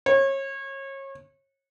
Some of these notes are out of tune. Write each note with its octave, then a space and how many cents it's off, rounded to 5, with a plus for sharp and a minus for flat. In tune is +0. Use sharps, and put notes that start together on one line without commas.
C#5 -30